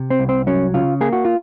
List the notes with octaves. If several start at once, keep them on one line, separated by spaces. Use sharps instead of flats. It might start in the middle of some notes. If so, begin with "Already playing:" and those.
Already playing: C3
C4
C2
C4
F#3 C#4
C#3 F4
A#3 G#4
F#4
F4